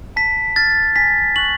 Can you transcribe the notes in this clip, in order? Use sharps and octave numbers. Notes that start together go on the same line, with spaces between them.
A5 B6
F6 A6
G#5 B6
C#6 F#6 F#7